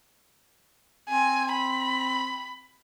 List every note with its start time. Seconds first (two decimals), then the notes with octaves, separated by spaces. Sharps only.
1.09 C4 G#5
1.53 B5